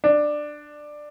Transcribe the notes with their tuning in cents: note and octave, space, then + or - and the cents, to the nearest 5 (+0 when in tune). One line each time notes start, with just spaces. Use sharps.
D4 +15